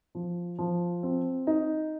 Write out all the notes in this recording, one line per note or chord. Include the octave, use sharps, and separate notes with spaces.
F3
F3
C4
D#4